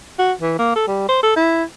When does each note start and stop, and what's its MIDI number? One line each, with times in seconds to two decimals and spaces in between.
0.19 0.32 66
0.41 0.54 52
0.59 0.74 58
0.76 0.88 69
0.88 1.04 55
1.08 1.21 72
1.23 1.36 69
1.36 1.64 64